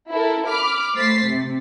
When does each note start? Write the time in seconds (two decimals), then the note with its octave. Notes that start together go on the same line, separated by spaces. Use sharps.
0.10 E4 A4 A#4
0.48 B5 D6 F6
0.95 A3 C5 A6 B6 C7
1.26 C3